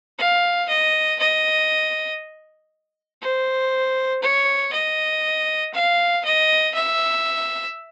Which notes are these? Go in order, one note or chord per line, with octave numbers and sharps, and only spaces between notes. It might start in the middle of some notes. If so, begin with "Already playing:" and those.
F5
D#5
D#5
C5
C#5
D#5
F5
D#5
E5